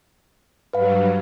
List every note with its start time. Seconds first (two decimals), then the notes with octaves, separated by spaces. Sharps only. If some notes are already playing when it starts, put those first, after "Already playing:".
0.73 G2 F#3 G3 B4 F5